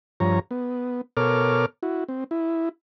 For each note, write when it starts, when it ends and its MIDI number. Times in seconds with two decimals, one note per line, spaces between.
0.20 0.39 43
0.20 0.39 53
0.20 0.39 73
0.20 0.39 82
0.51 1.01 59
1.17 1.66 47
1.17 1.66 69
1.17 1.66 70
1.17 1.66 73
1.17 1.66 86
1.17 1.66 89
1.83 2.04 64
1.83 2.04 66
2.08 2.24 60
2.31 2.69 64